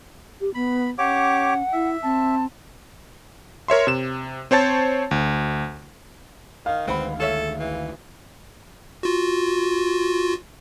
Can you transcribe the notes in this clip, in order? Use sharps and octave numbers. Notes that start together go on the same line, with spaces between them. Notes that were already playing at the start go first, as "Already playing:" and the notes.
G4
B3 B5
C#4 G4 C#5 F#5 D6
E4 E5
C4 A5
A#4 C#5 E5 C6
C3 E7
C4 C5 C#5 A5 A6
D2
D#3 F5
D2 D#3 G#3 C4 B4 F#5 B5
G#4 A4 C#5 E5
E3
F4 F#4